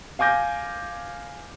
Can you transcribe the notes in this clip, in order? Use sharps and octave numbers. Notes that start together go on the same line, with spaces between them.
F5 G#5 D6 G6 A#6